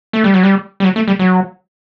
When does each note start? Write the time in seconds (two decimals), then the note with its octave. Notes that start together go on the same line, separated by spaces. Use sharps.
0.13 A3
0.24 G3
0.34 F#3
0.43 G3
0.80 G3
0.84 F#3
0.96 A3
1.08 G3
1.19 F#3